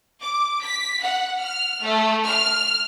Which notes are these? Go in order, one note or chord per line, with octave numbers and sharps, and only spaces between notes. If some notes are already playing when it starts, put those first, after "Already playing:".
D6
B6
F#5
F6
A3
F6